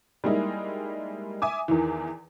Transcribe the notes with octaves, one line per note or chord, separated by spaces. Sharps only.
G3 G#3 A#3 D#4 E4
E5 G#5 D6 D#6
E2 D#3 E3